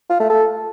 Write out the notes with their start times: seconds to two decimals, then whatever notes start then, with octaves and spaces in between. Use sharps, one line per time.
0.09 F4
0.20 A3
0.30 A4